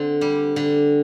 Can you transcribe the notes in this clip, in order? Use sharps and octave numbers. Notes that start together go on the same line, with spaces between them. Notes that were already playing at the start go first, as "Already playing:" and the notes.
Already playing: D3 C4
G3
D3